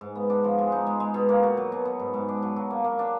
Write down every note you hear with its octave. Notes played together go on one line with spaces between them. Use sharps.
G#2
B3
D4
F3
G#3
D#4
G#3
G#3
B2
A#3
F#4
F#3
B2
B3
G#2
G#2
D4
F#3
F#3
A#3
A#3
D4